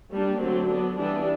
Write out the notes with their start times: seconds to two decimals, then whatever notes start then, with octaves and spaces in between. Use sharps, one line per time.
0.12 G3 A#3 D4
0.40 D3 F#3 A3 C4
0.68 F#3 B3 D4
0.98 E3 G3 B3 D4